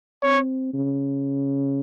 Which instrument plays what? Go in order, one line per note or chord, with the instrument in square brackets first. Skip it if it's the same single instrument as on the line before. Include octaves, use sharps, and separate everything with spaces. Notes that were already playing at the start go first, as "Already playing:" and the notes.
[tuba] C4 [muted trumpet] C#5
[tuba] C#3